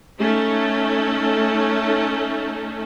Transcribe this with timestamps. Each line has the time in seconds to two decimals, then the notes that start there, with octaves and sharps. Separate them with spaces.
0.20 A3 C#4 D#4 A4